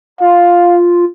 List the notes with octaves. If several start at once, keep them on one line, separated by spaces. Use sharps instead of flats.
F4 F5